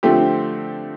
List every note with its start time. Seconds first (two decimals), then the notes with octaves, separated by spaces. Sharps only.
0.03 D3 F3 A3 C4 G4